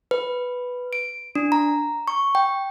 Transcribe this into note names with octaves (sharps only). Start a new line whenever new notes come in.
B4
D7
D4
A#5
C#6
G5